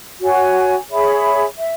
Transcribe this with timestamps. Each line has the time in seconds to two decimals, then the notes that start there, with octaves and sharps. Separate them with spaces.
0.21 F#4 C#5 G#5
0.90 G#4 C#5 E5 B5
1.59 E5